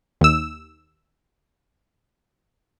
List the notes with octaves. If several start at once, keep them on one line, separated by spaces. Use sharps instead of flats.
D#2 E6